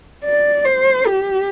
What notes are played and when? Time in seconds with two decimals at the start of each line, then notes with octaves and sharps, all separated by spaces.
0.24 D5
0.65 C5
1.06 G4